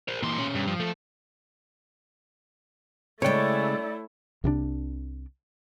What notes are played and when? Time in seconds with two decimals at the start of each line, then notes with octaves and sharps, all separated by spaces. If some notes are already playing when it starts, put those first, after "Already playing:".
0.08 A#4 C5
0.22 A#2 E3 A#3 C6
0.38 B2 C#4
0.55 G2
0.68 F3
0.80 A3 A4
3.22 C#3 G#3 A3 E4 C#5 D5 G5
4.44 C2 C3 F3 D4